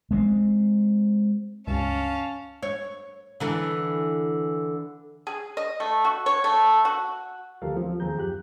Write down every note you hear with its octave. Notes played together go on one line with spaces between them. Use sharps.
G#3 A3 C4
C#2 G2 C#4 F5 A5
C#5
D3 E3 A4
G#4
D#5
A3
F#4
C#5
A3
F#4
D2 F3 G4 A4 A#4 F5
F3 C4
D#2 F3 C4 G#4 A#5 G6
F#2 G4 F#6